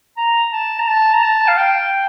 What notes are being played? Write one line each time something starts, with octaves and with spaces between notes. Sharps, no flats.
A#5
A5
A#5
A5
A#5
A5
F5
G5